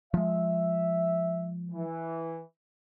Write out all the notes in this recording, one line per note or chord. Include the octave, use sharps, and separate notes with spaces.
F3 G#3 E5
E3